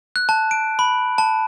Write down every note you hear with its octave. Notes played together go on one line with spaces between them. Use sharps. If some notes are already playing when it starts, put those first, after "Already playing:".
F#6
A5
D7
B5
A5